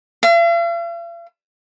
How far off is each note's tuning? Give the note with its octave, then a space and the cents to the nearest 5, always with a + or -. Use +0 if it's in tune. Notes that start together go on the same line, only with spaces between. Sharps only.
F5 -45